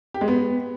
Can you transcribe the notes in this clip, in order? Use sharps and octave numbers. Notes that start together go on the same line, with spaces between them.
G4
G#3
B3